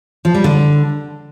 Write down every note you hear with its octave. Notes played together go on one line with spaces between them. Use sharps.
F3
G3
D3